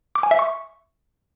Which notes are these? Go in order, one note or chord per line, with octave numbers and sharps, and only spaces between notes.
D6
G#5
E5
C#6